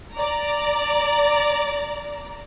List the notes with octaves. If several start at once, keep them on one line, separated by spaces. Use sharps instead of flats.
D5 A#5